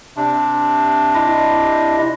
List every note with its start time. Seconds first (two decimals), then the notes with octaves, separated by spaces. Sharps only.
0.16 C3 D4
1.15 E4 D#5